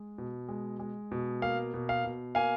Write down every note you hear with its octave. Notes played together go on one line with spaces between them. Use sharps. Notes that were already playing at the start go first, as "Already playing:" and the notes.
Already playing: G#3
B2
G#3
G#3
B2
A#3 F5
B2
F5
B2
A#3 F5 G#5